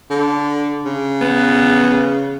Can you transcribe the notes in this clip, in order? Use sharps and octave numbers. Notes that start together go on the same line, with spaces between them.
D3
C#3
B3